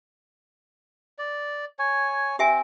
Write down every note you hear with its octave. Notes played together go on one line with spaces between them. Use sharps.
D5
C#5 G#5
C4 G4 E5 G#5